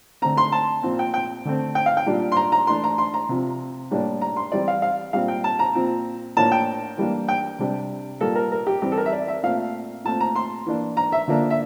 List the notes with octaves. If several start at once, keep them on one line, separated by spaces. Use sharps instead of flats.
D3 A3 C4 A#5
C6
A5
A#2 F3 C4
G5
G5
D3 A3 C4
G5
F5
G5
A#2 G3 D4
C6
A#5
A#5
E3 A3 D4 C6
A#5
C6
A#5
C3 F3 C4
A2 G3 A#3 D4
A#5
C6
E3 G3 C4 D5
F5
F5
A#2 G3 C4 F5
G5
A5
A#5
A#2 F3 C4
A2 F3 A#3 D4 A5
G5
E3 G3 A#3 D4
G5
C3 G3 D4
A#2 G3 A#3 A4
A#4
A#4
G4
E3 G3 C4 G4
A4
A#4
E5
D5
E5
A#2 A3 C4 F5
A#2 A3 C4 A5
A#5
C6
E3 A#3 D4
A#5
E5
D3 F3 A#3 D4
E5